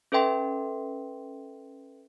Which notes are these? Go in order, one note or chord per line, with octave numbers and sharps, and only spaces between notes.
C#4 A4 B4 E5 G5 C6